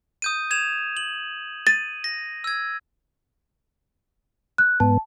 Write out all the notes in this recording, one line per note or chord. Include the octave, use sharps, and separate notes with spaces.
D#6 G6 D#7
G#6 E7 F7
F#7
A6 D#7
A#6
E6 G#6
F#6
G#2 B3 A5